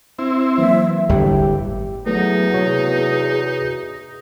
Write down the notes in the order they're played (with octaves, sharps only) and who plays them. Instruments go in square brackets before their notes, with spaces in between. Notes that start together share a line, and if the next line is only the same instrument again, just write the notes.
[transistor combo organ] C4 E4
[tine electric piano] E3 F#3 A#3 [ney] E5
[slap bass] G1 E2 A2 [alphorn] G4
[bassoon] E2 [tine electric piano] F#3 A3 [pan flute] B3 [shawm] D#4
[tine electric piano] C3 F#4 C#5 [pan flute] G#4